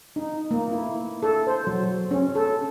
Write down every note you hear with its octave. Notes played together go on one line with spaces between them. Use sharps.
D#4
A#3
E4
A4
C5
F#3
C#4
A4